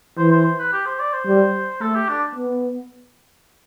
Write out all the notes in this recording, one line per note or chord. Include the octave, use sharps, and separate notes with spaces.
E3 C5
C5
C5
B4
G4
C5
D5
C5
G3
A3 A4
G4
D4
B3